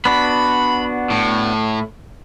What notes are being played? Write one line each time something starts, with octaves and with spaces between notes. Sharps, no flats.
B3 D4 F#4 B5
A2